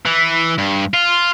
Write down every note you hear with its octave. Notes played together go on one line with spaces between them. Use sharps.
E3
G2
F4